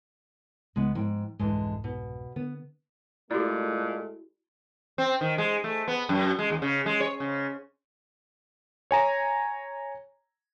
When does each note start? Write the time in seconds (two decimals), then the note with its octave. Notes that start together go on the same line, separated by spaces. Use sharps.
0.76 C2 C#3 F3 G#3 B3
0.95 G#2 F3 G5
1.39 C2 F2 G#2 D3 E3 G#3
1.84 B2
2.36 D3 B3
3.31 A#2 G#3 A3 E4 F#4 G4 D5
4.98 C4
5.21 D#3
5.38 G#3
5.64 A3
5.88 B3
6.09 F#2
6.39 G#3
6.50 D#2
6.62 C#3
6.86 G#3
7.00 C#5
7.20 C#3
8.91 C#5 G#5 A#5